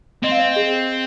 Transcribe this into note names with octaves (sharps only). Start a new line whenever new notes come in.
C4 D#5
F5
D#5
G#4